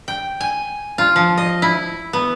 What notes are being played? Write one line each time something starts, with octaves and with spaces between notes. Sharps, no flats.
G5
G#5
F4
F3
D#5
E4
B3